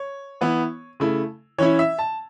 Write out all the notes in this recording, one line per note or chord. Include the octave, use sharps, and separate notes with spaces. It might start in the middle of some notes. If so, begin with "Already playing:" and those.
Already playing: C#5
E3 B3 E4
C#3 A3 E4
E3 C#4 E4 C#5
E5
A5